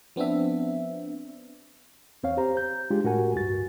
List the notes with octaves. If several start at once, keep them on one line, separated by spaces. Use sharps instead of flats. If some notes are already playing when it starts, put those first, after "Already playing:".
F3 B3 C4 D4 E5
E2 C4 C#5 F5
G4 C5 A#5
G6
G#3 D4 F4 G4
A2 F#4 G4 A#4 F#5 G#5
C#2 G2 F#4 A6